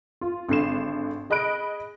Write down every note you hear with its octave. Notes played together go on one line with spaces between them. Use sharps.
F4
G#1 D3 C7 E7
G#4 D#5 B5 F#6 D7